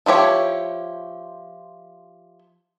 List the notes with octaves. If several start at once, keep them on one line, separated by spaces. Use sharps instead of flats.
F3 E4 G4 C#5